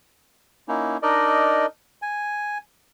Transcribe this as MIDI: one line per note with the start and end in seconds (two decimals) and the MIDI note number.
0.68 0.97 58
0.68 0.97 61
0.68 0.97 63
0.68 0.97 64
1.03 1.66 62
1.03 1.66 63
1.03 1.66 70
1.03 1.66 74
1.03 1.66 75
2.02 2.58 80